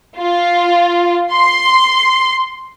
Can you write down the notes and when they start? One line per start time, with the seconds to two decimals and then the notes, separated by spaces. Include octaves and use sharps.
0.20 F4
1.31 C6